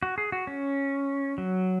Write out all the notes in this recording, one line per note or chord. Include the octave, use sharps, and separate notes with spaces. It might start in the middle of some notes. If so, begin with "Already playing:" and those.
F#4
G#4
F#4
C#4
F#3